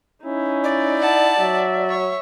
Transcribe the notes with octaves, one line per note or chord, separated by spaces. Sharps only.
C#4 D#4 E4
D5
F#5 A5
F#3 E5
C#5